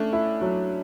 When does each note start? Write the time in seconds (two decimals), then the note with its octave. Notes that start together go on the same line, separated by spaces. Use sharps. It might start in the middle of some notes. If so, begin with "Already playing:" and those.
Already playing: A3 C#4 D4
0.13 E4
0.41 F#3